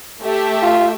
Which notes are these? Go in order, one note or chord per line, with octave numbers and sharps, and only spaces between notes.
A3 G4 E5
F4